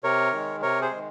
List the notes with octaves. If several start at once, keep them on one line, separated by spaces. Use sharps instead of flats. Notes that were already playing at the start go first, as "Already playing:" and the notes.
C3 A#4 C#5
D#3 G#3
C3 A#4 C#5
G#4 C5
D#3 G#3